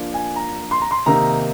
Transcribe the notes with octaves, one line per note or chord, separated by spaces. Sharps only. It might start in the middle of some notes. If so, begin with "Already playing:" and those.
Already playing: F3 A#3 D4
G#5
A#5
C6
A#5
C6
C3 D#3 A#3 D#4 A#5